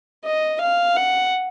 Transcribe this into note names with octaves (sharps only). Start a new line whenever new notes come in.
D#5
F5
F#5